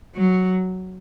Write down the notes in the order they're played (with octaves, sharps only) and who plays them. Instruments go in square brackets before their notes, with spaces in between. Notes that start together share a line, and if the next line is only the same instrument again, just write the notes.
[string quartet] F#3